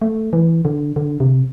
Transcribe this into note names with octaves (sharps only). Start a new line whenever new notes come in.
A3
E3
D3
D3
C3